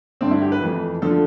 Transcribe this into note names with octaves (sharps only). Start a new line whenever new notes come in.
G2 D3 A3 C4
E4
G4
B4
F2 E3 A3
D3 F3 A3 A4